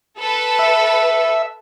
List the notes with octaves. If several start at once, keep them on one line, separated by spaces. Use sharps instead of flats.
A4 B4
E5